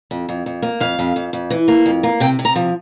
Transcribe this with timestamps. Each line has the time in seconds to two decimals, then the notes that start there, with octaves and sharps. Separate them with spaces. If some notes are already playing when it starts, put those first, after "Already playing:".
0.11 F2
0.29 F2
0.46 F2
0.62 A#3
0.80 F2 F5
0.99 F2
1.16 F2
1.33 F2
1.51 E3
1.68 A#3
1.86 F2
2.03 A#3
2.20 C3 G5
2.39 C3
2.45 A#5
2.56 F3